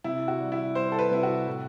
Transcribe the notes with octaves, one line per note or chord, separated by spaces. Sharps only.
C3 E4
F#4
G3
E4
G3 C5
A4
B4
C3 E4
F#4
A2